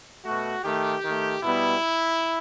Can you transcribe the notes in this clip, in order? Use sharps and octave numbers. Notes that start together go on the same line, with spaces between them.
B2 A3 F#4
D#3 A3 G4
D#3 A3
B2 G3 B3 E4